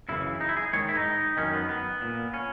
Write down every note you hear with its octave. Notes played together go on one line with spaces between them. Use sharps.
F#2 C#3 E3 E4
D#4
E4
G#4
G#2 D#3 C#5
E4
D#4
F#2 D#3 C#4
B3
B3
A#2
C#4